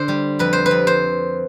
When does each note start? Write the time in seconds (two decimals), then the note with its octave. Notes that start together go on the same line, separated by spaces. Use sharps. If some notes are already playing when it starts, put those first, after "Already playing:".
Already playing: D3 C5
0.08 G3
0.39 F2 B4
0.53 C5
0.66 B4
0.71 F2
0.87 C5